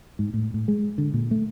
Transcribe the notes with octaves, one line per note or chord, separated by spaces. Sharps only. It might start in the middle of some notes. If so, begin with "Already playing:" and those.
G#2
A2
A2
G#3
D3
A#2
A3